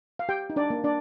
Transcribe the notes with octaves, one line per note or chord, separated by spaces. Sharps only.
F5
G4 G5
D#4
D4 D5
A#3
D4 D5